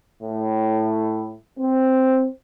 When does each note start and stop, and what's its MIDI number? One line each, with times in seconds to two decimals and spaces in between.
0.23 1.34 45
1.59 2.27 60